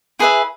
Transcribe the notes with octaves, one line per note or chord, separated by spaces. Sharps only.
E4 G#4 B4 E5